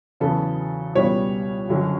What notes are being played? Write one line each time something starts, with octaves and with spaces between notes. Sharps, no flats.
E2 C#3 F#3 B3 A4
C#2 B2 G3 B3 C#5
F#1 F#2 D3 F#3